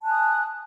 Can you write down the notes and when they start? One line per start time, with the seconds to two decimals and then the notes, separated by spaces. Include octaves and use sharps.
0.02 A5
0.05 F#6
0.07 G#5
0.10 D#6